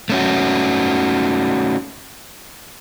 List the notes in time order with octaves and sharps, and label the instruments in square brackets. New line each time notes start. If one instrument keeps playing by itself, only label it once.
[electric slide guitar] A3 C#4 F#4